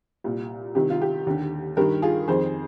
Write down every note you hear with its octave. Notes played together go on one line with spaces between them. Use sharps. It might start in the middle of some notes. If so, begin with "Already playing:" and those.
C2 A#2
C2 C3 D#3 G4
F4
G4
D#2 D3
G2 D#3 G4 A#4
F4 G#4
F2 D#3 G#4 C5